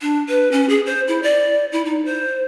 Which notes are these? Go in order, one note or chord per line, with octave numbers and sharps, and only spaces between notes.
D4
B4
C#4
G#4
C5
E4
D5
E4
D#4
C5